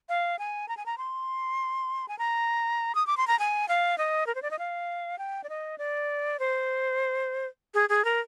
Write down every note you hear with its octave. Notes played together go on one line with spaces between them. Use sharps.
F5
G#5
A#5
G#5
A#5
C6
G#5
A#5
D#6
D6
C6
A#5
G#5
F5
D#5
A#4
C5
D5
D#5
F5
G5
D5
D#5
D5
C5
G#4
G#4
A#4